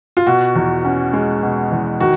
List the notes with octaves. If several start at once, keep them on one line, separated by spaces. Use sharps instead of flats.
F4
B2 F#4
E2
C#4
G#3
B2
E2
D#3 F#4